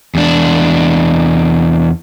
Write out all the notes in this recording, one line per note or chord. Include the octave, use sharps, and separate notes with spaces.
E2 D4